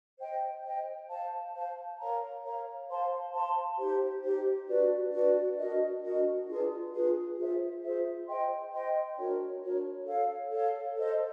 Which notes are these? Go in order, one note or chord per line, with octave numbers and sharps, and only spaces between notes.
C5 D#5 G5
C5 D#5 G5
C5 F5 A5
C5 F5 A5
A#4 C#5 F5 A#5
A#4 C#5 F5 A#5
C5 F5 A5 C6
C5 F5 A5 C6
D#4 G4 C5
D#4 G4 C5
D4 F#4 B4 D5
D4 F#4 B4 D5
D4 F#4 A#4 D#5
D4 F#4 A#4 D#5
D4 F4 G#4 B4
D4 F4 G#4 B4
F4 G#4 C5 E5
F4 G#4 C5 E5
C5 D#5 G5 C6
C5 D#5 G5 C6
D4 F#4 A#4 C#5
D4 F#4 A#4 C#5
A4 C#5 F5
A4 C#5 F5
A4 C5 D#5